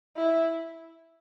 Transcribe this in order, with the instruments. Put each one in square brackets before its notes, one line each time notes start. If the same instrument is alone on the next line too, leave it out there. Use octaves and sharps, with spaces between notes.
[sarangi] E4